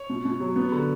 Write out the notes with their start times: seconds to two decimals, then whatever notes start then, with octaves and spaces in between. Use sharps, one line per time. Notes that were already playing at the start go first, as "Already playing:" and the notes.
Already playing: C#5
0.10 B2
0.25 B2
0.40 F#3
0.56 B3
0.72 D3